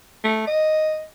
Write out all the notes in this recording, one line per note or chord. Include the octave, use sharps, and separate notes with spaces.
A3
D#5